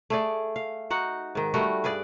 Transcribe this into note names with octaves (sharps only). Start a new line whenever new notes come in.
A3 G#4 D5
F5
D#4 F#4 F#5
G#2 D#3
G3 A3 F#4
G2 G#4 B4 D5